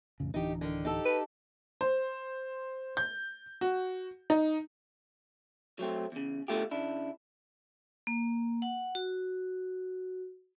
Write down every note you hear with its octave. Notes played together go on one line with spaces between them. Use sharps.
A1 F2 C#3
D1 E3 D4 D#4 G4
D3 D#3
D#4 G4 A4
B4
C5
G6
F#4
D#4
F#3 A3 C4
E2 C#3
B2 D3 A3 F4 G4
C#3 D4 E4
A#3
F#5
F#4